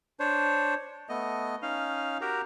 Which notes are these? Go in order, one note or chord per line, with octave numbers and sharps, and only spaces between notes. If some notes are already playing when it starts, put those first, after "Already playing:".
D4 C5 C#5
A3 B3 D#5
C#4 D#4 F5
F#4 G4 A#4 A#5